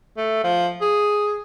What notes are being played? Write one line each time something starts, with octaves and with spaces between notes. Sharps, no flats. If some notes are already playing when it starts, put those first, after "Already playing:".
A3
F3
G#4